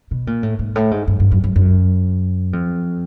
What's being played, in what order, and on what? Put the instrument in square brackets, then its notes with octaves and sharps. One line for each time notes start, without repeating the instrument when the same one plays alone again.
[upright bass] B2
A#2
A2
G#2
A2
G#2
G2
G2
F#2
F#2
F#2
F2